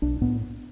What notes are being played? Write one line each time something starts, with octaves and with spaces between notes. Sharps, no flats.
B1 D4
A2 B3